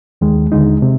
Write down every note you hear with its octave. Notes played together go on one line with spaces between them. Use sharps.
D#2 D#3 G#3
D#2 D3 G#3 D#4
C3